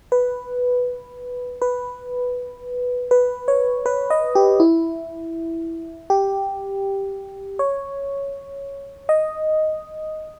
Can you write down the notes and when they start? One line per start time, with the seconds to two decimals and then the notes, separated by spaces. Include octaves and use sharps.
0.12 B4
1.62 B4
3.11 B4
3.48 C#5
3.86 B4
4.10 D#5
4.35 G4
4.60 E4
6.10 G4
7.59 C#5
9.09 D#5